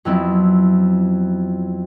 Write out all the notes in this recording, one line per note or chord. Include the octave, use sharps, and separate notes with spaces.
F2 F#3 B3 C4 E4